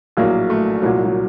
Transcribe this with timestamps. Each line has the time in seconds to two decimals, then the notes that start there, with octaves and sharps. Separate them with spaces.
0.17 A#1 A2 F#3 A#3
0.50 A3
0.82 C2 A#2 F#3
1.05 F#3